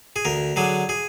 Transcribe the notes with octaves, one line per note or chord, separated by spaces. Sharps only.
G#4
D2 A#4
D3 F#3 G#4
G#4